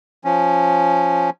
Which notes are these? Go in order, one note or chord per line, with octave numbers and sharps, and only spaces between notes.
F3 C#4